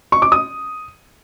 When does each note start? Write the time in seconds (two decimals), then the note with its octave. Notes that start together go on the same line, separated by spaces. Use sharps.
0.12 C#6
0.22 D6
0.32 D#6